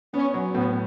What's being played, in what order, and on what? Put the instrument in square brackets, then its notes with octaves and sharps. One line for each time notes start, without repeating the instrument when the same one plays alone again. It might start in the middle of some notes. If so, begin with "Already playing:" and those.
[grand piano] B3 [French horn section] C#4
[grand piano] F#3
[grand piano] A2 [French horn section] B3